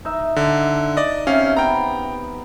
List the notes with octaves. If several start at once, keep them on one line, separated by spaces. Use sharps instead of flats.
D#4 E5
D3
D5 D#5
C3 C#4 F5
B3 G5 A#5